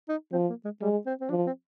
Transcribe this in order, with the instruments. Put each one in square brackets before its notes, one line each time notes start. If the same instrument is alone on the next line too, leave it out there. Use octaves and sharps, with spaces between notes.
[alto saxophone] D#4
[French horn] F3 [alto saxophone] C4
[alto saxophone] A#3
G#3
[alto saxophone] G3 [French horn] G#3
[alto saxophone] C4
C4
[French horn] F3 [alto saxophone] D4
[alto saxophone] C4